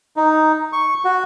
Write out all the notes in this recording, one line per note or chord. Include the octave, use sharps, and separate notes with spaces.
D#4
C#6
F#4